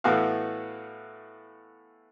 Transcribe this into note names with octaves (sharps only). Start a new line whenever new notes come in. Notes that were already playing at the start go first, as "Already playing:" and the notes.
A2 E3 A3 B3 F#4 F5